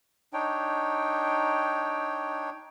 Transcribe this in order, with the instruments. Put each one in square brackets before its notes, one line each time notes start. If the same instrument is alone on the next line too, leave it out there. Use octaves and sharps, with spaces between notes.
[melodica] D4 D#4 C#5 G5